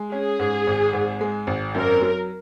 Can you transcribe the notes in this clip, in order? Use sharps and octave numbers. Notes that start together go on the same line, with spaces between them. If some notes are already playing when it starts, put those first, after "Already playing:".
Already playing: G#3
C#4 G#4
G#2
G#1
G#2
G#3
G#1
F#2 A#4
F#3